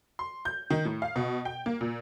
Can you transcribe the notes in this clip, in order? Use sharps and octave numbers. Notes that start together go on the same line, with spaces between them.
C6
G6
D#3
A2
F5
B2
G5
A#3
A#2